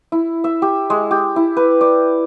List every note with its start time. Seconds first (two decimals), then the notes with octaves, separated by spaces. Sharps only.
0.12 E4
0.44 E5
0.62 G4
0.90 G#3
1.11 G4
1.36 E4
1.57 B4
1.81 D5